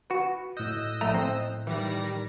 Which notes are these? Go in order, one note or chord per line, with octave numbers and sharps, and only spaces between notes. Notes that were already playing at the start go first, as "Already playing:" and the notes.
F#4 B4
A2 D#5 E6 F#6 G6
A#1 A3 A#5
C4
D#3 E3 G3 A#6